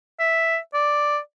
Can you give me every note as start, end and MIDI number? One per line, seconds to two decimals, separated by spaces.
0.19 0.58 76
0.74 1.18 74